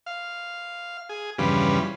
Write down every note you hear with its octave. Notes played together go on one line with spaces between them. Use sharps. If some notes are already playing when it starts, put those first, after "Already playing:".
F5
G#4
E2 G2 C#3 F3 G3 B4